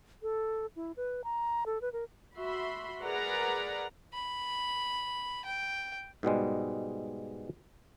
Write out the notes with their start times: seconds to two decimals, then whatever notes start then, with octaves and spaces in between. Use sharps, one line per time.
0.23 A4
0.76 E4
0.97 B4
1.24 A#5
1.66 A4
1.82 B4
1.93 A#4
2.36 F#4 E5 B5 C6
3.03 G#4 A#4 B4 D5 F#5 A#5
4.13 B5
5.45 G5
6.23 G#2 B2 G3 G#3